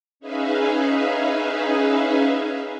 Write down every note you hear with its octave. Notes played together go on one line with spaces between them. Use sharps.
C#4 D#4 G#4 B4 E5 F5